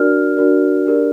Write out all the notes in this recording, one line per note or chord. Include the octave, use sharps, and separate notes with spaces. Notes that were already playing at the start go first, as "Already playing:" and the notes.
Already playing: D4 F#4 A#4 D5 F6
D4 F#4 A#4 D5
D4 G4 A#4 D5